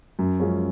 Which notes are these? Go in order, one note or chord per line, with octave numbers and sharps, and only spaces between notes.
F#2
F3 G#3 C#4